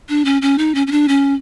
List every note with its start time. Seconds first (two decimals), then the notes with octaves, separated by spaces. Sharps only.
0.09 D4
0.25 C#4
0.42 C#4
0.58 D#4
0.75 C#4
0.87 C#4
0.91 D4
1.08 C#4